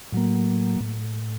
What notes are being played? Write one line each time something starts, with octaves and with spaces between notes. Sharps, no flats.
A2 F#3 A#3
A2